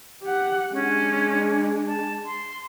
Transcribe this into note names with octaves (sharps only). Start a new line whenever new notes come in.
G4 F#5
G#3 C#4 D4
A5
C6